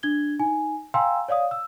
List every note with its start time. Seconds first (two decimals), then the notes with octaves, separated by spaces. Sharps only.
0.03 D4 G#6 G7
0.40 D#4 G#5
0.94 F5 G5 G#5 A#5 C6 E6
1.29 C#5 D5 F5 D#6
1.51 E6